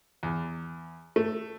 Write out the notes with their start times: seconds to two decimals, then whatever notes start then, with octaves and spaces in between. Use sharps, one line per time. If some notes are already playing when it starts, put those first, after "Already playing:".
0.23 E2
1.16 A3